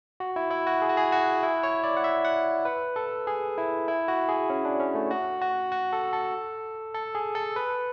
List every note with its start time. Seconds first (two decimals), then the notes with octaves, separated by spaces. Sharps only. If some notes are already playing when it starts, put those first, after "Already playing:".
0.20 F#4
0.36 E4
0.51 E4
0.67 F#4
0.82 G#4
0.89 F#4
0.97 G#4
1.12 F#4
1.43 E4
1.63 C#5
1.84 D5
1.97 F#5
2.04 E5
2.25 F#5
2.65 B4
2.96 A4
3.27 G#4
3.58 E4
3.88 E4
4.08 F#4
4.29 G#4
4.50 C#4
4.65 D4
4.80 C#4
4.95 A3
5.11 F#4
5.42 F#4
5.72 F#4
5.93 A4
6.13 A4
6.95 A4
7.15 G#4
7.35 A4
7.56 B4